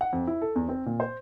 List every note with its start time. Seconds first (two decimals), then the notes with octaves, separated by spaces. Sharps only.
0.01 F#5
0.13 F2
0.27 E4
0.42 A4
0.56 E2
0.69 C4
0.86 A#2
1.00 C5